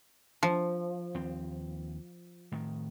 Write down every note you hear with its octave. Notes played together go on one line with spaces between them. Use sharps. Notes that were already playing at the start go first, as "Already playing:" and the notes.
F3
D#2 C4
A2 D#3